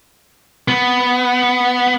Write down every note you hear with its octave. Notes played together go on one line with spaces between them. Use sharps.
B3